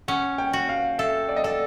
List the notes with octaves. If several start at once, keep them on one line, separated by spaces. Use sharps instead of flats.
C#4 F#5
G5
F#4
F5
A4 E5
D5
D#5
A4 D5